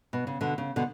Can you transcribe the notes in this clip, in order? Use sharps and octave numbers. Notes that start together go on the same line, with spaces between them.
B2
C#3
B2 D3
C#3
B2 D3